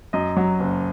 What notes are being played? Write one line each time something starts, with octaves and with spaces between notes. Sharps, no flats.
F#2 D#5
F#3
F#1